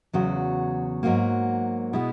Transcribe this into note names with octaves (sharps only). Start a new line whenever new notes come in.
E2 C#3 F#3 F#4
G#2 F#3 A#3 F#4
B2 G#3 B3 E4